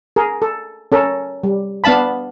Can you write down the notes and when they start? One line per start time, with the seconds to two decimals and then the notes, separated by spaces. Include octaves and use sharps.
0.16 G#4 A#4
0.42 A4
0.92 C#4 A4 A#4
1.43 G3
1.84 B3 D4 F5 A5 B5